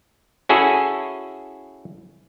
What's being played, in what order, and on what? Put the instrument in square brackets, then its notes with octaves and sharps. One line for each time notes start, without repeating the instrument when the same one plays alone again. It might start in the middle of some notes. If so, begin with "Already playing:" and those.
[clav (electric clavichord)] C#4 E4 F#4 G#4 A4